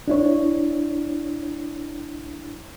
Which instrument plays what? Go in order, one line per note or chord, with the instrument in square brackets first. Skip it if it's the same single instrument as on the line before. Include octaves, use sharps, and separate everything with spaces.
[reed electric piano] D4 E4 C#5